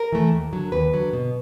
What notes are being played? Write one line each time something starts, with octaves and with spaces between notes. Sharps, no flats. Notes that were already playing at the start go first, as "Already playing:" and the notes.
Already playing: A#4
E3 A3
D#2
D3 F#3
D#2 B4
D3 F#3
B2